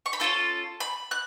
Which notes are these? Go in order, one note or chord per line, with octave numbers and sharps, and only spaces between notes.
C#6
B5
C#4 F4 A4 A5
B5
F#6